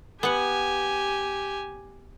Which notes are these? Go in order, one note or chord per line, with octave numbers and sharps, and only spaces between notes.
B3 G4 F#5 G#5